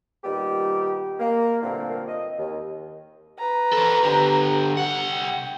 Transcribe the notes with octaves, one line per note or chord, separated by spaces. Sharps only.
A#2 D#3 G3 B3 D#4 G4
A#3
C2 G2 A#2 D3 A3 C4
D#5
D#2
B4 A#5
A4 C5
D3 G4
C2 F#5
G5